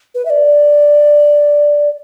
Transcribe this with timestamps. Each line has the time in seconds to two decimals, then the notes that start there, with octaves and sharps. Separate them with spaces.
0.15 B4
0.25 E5
0.30 D5